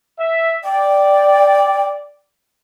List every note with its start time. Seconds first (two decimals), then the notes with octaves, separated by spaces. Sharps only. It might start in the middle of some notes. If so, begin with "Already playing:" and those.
0.20 E5
0.64 D5 G5